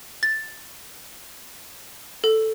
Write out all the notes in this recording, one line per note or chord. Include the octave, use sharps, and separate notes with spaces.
A6
A4